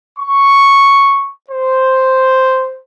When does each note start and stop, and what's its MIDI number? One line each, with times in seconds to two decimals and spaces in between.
0.18 1.30 85
1.51 2.79 72